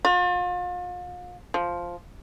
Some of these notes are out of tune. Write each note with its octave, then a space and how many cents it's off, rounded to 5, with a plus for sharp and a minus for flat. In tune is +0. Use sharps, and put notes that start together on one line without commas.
F4 +40
F3 +0